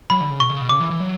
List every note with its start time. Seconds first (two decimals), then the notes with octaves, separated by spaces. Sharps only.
0.10 F#3 B5
0.21 D3
0.30 C#3
0.40 B2 C#6
0.50 C#3
0.61 B2
0.69 C#3 D6
0.80 E3
0.90 E3
1.00 F#3